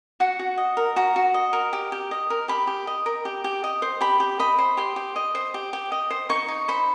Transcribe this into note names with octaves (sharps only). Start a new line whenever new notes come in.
F#4 F#5
F#4
D#5
A#4
F#4 A#5
F#4
D#5
A#4
G4
G4
D#5
A#4
G4 B5
G4
D#5
A#4
G4
G4
D#5
C5
G4 B5
G4
D#5 B5
C5
G4 C6
G4
D#5
C5
G4
G4
D#5
C5
D#4 C#6
D#4
C5 B5